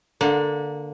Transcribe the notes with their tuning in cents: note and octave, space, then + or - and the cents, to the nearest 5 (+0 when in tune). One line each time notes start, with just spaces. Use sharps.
D3 +0 A#3 +0 F#5 -30